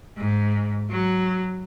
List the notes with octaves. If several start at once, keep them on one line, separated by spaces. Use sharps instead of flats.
G#2
F#3